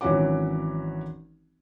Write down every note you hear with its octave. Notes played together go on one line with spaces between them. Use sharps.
G#1 E3 F#3 C#4 F#4 D6